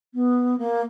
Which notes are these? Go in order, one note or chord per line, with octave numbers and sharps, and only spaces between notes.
B3
A#3